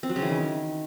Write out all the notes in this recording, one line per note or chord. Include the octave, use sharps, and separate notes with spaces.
C4
F#3
C#3
E3
D#3